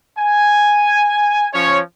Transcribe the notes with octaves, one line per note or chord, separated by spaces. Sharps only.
G#5
F3 C#4 C#5